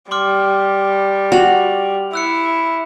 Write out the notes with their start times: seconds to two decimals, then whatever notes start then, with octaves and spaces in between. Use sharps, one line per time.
0.11 G3 C6 D6 F6
1.32 F#4 F7 F#7
2.13 E4 E6 F#6 C#7